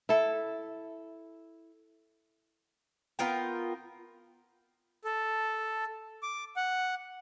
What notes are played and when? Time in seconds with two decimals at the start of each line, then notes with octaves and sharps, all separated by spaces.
0.09 E4 A4
3.19 B3 F4 A#4 G5
5.04 A4
6.23 D6
6.56 F#5